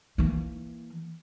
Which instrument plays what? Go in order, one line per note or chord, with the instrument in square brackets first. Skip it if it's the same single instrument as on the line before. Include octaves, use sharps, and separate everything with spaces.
[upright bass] E3 A#3